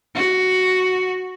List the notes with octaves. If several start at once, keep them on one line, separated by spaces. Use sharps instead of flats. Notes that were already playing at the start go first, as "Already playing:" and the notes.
F#4